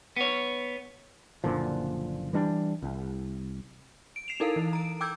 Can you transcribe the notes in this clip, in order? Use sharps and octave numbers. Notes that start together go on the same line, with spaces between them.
B3 C#5
F#1 A#2 D3 F3
E3 G3 D4
C2
D7
C7 E7 F7
D#4 E4 A4 A#4 F5
E3
A#5 D7
G5 D6 E6 G6 G#6